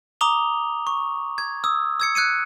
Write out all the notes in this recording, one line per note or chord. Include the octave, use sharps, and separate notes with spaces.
A#5 D6 D#6 F7 G7
C#6
G#6
D#6 E6
E6 G#6 C#7
F#6 G#6 C#7 D#7